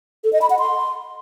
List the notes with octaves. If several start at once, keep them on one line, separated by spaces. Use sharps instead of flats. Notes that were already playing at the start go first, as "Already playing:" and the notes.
A4
D#5
B5
F#5
C6